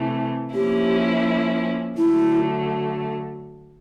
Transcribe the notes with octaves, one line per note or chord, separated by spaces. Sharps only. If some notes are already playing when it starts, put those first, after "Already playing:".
Already playing: C3 E3 A3
F3 A#3 C#4 E4 G4
D3 F#3 A3 E4